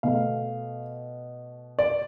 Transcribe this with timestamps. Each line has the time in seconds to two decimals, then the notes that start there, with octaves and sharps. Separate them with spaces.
0.03 B2 A3 F5
1.79 D5